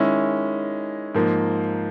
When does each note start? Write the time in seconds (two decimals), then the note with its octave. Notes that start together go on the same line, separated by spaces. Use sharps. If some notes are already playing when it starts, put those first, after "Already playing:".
Already playing: D#3 G#3 C#4 E4
1.15 G#2 F3 A#3